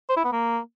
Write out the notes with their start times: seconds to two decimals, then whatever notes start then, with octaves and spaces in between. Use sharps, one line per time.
0.09 C5
0.17 E4
0.25 B3
0.32 A#3